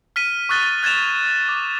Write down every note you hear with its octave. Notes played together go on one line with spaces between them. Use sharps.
F6 B6 D#7
C#6 D#6 F#6 A6 G7
F#6 G#6 A6 E7 F7
D6